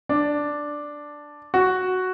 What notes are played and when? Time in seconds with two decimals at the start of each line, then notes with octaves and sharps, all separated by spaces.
0.09 D4
1.54 F#4